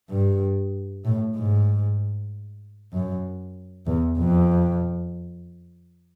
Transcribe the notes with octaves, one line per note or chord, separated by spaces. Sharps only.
G2
A2
G#2
F#2
E2
F2